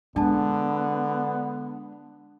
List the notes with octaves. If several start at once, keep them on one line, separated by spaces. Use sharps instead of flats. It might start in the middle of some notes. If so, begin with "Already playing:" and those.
D3 G#3 B3 D4 A5